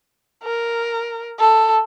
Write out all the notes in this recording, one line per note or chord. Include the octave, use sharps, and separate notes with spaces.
A#4
A4